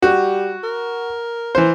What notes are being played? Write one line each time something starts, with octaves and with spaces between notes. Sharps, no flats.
G3 F#4
A#4
E3 C5